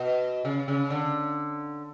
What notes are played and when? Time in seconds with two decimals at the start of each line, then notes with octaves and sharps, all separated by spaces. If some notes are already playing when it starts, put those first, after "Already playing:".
Already playing: B2
0.45 C#3
0.68 C#3
0.90 D3